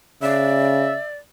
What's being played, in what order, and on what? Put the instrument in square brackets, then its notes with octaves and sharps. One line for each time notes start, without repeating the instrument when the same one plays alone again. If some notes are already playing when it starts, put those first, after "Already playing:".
[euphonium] C#3 [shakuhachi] D5 [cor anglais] E5